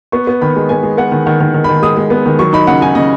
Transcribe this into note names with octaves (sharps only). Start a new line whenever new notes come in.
B3 C#6
B3
D#3 B5
G#3
B3 G#5
G#3
B3 F#5
D#3
D#3 F#5
D#3
D#3
D#3 B5
G#3 D#6
G#3
B3
D#3
F#3 C#6
D#4 B5
C#3 F#5
D#4 G#5
C#3 D#5